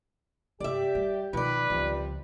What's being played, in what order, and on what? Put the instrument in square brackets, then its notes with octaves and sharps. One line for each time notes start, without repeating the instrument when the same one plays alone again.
[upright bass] G2 C3 [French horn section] G4 [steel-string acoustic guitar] D5 E5
[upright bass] G3
[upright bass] B2 F3 [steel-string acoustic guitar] D#3 D5 [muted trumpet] B4
[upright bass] C#2 F3 [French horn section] C3 G3 F4